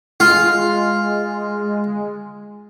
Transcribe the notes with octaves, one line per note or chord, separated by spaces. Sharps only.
G#3 F4